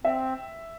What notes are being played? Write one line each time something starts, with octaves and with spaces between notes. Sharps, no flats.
C4 E5